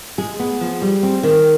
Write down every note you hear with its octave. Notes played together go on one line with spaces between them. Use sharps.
G#3 G#4
B3
F3
G3
C4
D#3